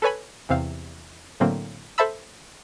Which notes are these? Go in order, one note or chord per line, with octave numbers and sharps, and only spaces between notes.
A4 B4 C#5 G#5 B5
E2 C3 C4 F5
A2 D3 F#3 A3 A#3 C4
A4 C5 E5 A5 B5 E6